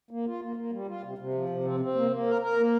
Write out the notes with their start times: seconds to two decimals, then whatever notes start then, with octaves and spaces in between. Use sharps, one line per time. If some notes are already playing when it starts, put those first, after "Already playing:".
0.11 A#3
0.26 F4
0.42 A#3
0.56 A#3
0.72 G3
0.87 F4
1.03 C3
1.18 C3
1.34 F3
1.49 C3
1.64 C4
1.80 C4
1.95 A#3
2.11 A#3
2.26 A#4
2.42 A#4
2.57 A#3